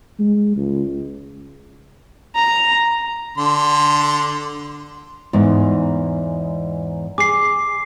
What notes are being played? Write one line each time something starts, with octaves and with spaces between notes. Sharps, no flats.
G#3
C#2
A#5
D3 C6
E2 G#2
G#4 D6 C7